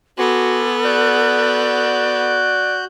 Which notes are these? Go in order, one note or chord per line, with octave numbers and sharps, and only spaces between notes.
B3 F#4 A4 G#5 C6 D6
F#4 D5 F#6 G6